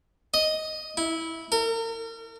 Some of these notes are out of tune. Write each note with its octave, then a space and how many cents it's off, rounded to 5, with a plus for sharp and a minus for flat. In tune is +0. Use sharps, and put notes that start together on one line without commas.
D#5 +5
E4 -15
A#4 -40